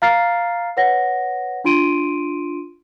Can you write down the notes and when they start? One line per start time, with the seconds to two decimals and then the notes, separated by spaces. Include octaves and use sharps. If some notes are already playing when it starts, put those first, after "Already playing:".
0.02 F5 A#5 F6 A6 C7
0.77 B4 C#5 F#5 A#6
1.64 D4 F4 C6 D7 D#7